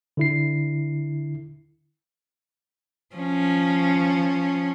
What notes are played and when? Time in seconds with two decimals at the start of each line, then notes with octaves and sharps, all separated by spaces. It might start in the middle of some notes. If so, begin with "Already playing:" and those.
0.17 D3 E4 C7
3.15 F3 C#4